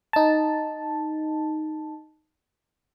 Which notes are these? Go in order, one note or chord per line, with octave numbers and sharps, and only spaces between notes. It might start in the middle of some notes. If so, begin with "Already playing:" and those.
D#4 A5